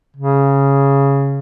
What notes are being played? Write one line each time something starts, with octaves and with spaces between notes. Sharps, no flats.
C#3